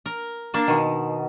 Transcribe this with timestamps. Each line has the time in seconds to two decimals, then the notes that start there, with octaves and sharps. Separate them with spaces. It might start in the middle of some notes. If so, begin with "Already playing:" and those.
0.06 A#4
0.54 A#3 D4 A5
0.68 B2 D#3